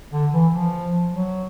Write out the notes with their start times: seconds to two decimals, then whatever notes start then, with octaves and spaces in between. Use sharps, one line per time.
0.12 D3
0.32 E3
0.51 F3
1.09 F#3